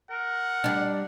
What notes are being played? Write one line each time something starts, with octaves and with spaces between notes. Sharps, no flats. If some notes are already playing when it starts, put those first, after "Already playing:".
A#4 F#5
G3 D4